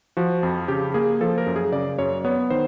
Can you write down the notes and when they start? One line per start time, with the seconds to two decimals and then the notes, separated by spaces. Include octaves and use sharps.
0.17 F3 F#4
0.43 F2
0.68 C#3 G4
0.94 A#3 G#4
1.21 F3 A4
1.38 A#4
1.47 F#2
1.56 G#4
1.72 C#3 D5
1.98 F#2 C#5
2.25 B3 C#5
2.50 D#3 C5